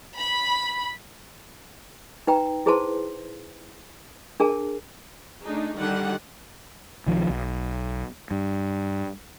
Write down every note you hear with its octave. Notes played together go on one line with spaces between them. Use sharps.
B5
D#4 B4 G5 A#5
E4 G#4 B4 C5 A5 C6
D4 G#4 A#4 A5
A3 D4 D#4 G#4
D3 D#3 G3 D4 D#4 F#5
B1 D#3 F3
B1
G2